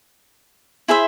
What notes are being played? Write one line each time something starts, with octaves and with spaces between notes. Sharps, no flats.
E4 G#4 C5 E5